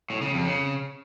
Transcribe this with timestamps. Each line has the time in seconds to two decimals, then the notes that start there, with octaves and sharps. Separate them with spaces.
0.10 A2
0.22 C#3
0.33 F2
0.45 C#3